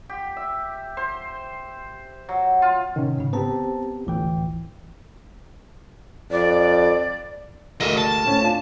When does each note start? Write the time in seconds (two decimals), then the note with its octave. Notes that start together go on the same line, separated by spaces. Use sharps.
0.10 G4
0.37 E5
0.97 C5
2.29 F#3
2.62 F4
2.96 A2 C3 D#3 C#4
3.18 G#2 C#3
3.33 B3 C4 G4 C5 A5 A#5
4.07 G1 D2 A2 E3 G5
6.31 F2 D5
7.80 D2 G#3 A#4 D#5 E5
7.97 A5
8.25 A2 C4 C#4
8.41 D4 F4